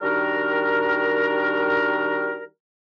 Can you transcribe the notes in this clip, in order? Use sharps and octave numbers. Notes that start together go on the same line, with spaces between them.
D#3 G3 D4 F#4 A#4